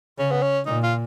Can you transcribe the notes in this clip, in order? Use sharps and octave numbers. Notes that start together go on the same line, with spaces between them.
C#3 C#4
B3
C#4
A#2 D#4
F4